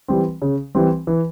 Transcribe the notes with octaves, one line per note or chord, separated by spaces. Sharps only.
E3 G3 C4
C#3
E3 G3 C4
E3